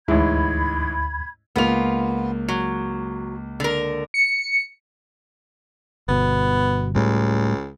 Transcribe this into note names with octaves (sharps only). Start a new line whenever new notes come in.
A1 D2 G#2 E4 B5 G#6
C#2 A#3 B3 F4 F7
F#3
D3 A#4
C#7
G1 B2 B3
C#2 A2 G3